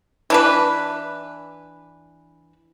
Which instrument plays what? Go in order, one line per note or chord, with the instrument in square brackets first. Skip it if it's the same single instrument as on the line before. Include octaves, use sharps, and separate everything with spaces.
[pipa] E3 D4 B4